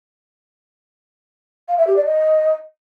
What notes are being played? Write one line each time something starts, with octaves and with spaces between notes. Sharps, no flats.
F5
E5
G4
D5
D#5